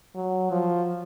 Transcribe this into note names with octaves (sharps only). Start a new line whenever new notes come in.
F#3
F3